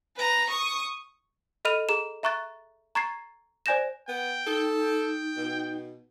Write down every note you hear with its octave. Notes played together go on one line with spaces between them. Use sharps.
B4 A#5
C#6 D#6
A4 D#5 B5 F6 D#7 F7
G#4 A#5 E7
E5 A#5 C#6 F#6 A6
A#5 C#6 G#6 A6 C7
C5 D5 G#5 G6 A#6 E7
B3 G5
D#4 A4
G5
B2